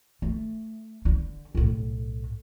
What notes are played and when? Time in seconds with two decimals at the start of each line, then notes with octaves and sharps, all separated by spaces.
0.22 A3
1.05 D3
1.55 B1 A2